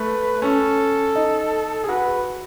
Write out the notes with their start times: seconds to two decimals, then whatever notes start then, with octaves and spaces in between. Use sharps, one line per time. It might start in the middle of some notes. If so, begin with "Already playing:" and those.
Already playing: A3 B4
0.42 C#4 A4
1.15 D#4
1.84 G#4
1.88 F#4 B4